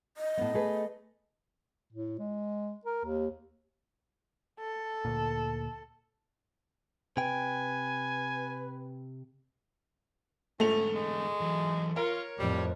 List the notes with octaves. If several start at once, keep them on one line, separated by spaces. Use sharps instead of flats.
D#5
A2 B3
A3 G#4 B4
A2
G#3
A#4
D#2
A4
D2 A#2
C3 B4 G5 G#5
G#2 D3 A3 C#4 F7
G#3
E3 F#3
F4 A#4 C#5
F2 A2 F3 G3